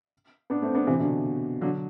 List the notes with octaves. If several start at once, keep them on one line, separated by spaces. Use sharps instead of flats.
B3 D4
A3 C4
B3 D4
C3 E3
B2 D3
D3 F#3